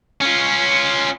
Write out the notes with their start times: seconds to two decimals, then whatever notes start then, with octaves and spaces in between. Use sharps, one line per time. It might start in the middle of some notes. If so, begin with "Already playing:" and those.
0.21 C#4 F4